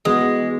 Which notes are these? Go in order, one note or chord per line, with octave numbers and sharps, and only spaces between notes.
E3 G#3 B3 F#4 B4